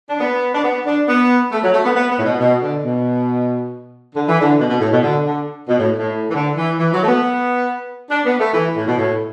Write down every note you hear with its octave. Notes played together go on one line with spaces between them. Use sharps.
D4
B3
D4
B3
D4
B3
A3
F#3
A3
B3
B3
B3
A2
B2
B2
D3
B2
D3
E3
D3
B2
B2
A2
B2
D3
D3
B2
A2
A2
E3
D3
E3
E3
F#3
A3
B3
D4
B3
A3
E3
A2
B2
A2